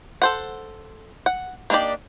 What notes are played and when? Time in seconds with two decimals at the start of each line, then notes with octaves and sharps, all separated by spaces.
0.22 A4 C5 F#5
1.26 F#5
1.70 A#3 D4 D#4 G4 D5